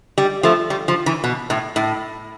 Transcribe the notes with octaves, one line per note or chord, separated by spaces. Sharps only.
G3
F3 A3
G3
F3
E3
B2
A2
A2